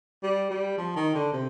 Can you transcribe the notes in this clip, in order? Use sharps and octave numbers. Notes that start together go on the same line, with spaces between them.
G3
G3
F3
D#3
D3
C3